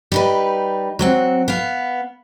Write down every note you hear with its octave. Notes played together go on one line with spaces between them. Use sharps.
G3 D#4 B4
F#3 C4 F#5
B3 F5